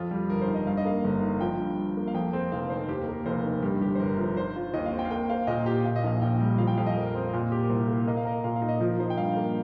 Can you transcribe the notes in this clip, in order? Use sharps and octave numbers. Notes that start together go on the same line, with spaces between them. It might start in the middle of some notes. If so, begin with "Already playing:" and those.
Already playing: F2 F4
G3
G1 A#4
C5
D#3
D#5
G2 F5
D#5
A#3 F5
G1
D#3
F3 G5
G2
G2
A#3
F5
F2 G5
C4
F1 F5
D#3 C5
D#2 G4
A#4
A#3
A#4
F1 C5
D#3
G2 G4
G1 G4
C5
G1 A#4
F3
D#3 C5
F4
D#2 D#5
F5
C4
G5
F5
A#3 G5
C5 F5
A#2 D#5
F4 G4
A#2 F5
D#5
A#1 F5
A#1 G5
G3
F3 F5
G5
F2 F5
D#5
F2 A#4
C4
A#2
G4
A#4
C2 C5
A#3
A#3 D#5
F5
A#4 D#5
A#2 F5
F5
D#4
D#5
F3 A#4
D#4 C5
G5
G2 F5
A#3